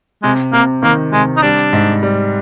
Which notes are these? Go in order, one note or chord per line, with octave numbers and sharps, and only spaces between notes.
C3 G#3
C3 A#3
D#3 A#3
C3 G#3
D#4
G3 D4
G#2
G3